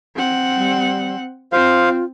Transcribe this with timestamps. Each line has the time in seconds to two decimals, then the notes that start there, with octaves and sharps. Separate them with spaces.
0.16 C4 F#5
0.57 G3
1.52 C4 F4 C5 F5